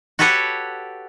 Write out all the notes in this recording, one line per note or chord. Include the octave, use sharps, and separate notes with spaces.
F#4 G4 A4 B4 C#5 F#5